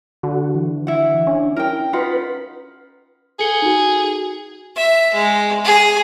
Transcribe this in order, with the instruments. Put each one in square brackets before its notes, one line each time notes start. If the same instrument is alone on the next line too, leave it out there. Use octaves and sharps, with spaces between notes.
[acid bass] D3 [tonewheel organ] F#4
[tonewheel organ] E3
[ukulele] E4 F#5
[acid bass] C#4 [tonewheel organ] D4
[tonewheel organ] E4 [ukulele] A#4 G5
[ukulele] D#4 F4 F#5 [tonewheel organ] B4 B5
[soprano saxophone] G#4 [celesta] A4 C#7 G7
[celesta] D#4 F#4
[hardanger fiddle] E5
G#3
G#4